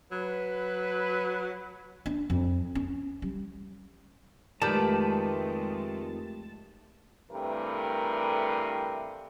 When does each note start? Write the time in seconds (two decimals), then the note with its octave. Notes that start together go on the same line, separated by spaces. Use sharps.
0.12 F#3 B4
2.06 D4
2.30 F2
2.75 C#4
3.22 G3
4.62 F2 D#3 G#3 A3 G4 B4 D5 A5
7.31 G2 C3 E3 A3 A#4 B4